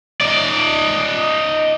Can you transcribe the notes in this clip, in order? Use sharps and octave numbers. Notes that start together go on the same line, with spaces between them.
D#4 D5